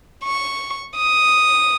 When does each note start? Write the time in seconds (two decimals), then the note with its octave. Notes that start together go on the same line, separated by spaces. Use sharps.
0.24 C#6
0.97 D#6